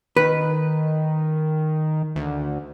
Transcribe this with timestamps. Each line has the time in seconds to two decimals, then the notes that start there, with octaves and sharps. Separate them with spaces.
0.17 D#3 B4
2.16 D2